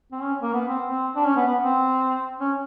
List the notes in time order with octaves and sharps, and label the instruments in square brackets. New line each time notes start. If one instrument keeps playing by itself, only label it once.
[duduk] C4
C#4
A#3
B3
C4
C4
D4
C#4
B3
B3
C4
C#4